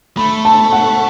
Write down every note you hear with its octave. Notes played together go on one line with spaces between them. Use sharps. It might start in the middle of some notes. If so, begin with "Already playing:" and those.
A3 B5
A5
F#5